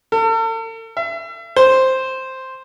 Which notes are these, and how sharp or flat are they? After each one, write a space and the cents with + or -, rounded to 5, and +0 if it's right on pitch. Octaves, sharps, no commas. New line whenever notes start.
A4 +45
E5 +40
C5 +0